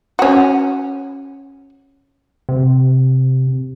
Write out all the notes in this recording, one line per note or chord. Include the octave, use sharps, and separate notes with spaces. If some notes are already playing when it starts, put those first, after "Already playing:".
C#4 F#4
C3